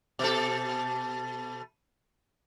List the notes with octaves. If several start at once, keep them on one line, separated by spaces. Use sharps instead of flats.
B2 A4